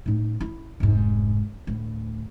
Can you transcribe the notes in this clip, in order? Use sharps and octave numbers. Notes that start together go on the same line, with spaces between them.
A2 D#4
E4
F1 G#2
D2 A2